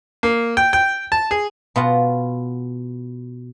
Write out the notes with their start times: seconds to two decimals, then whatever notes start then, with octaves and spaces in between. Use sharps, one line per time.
0.23 A#3
0.57 G5
0.73 G5
1.12 A5
1.31 G#4
1.76 B2 F4 F#5